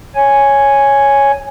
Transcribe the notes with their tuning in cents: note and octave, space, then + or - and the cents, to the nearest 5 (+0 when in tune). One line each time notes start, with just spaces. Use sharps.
C#5 +0 G#5 +0